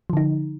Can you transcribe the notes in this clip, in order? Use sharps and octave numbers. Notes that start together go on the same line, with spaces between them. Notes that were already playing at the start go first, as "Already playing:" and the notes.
D3 F3 D#4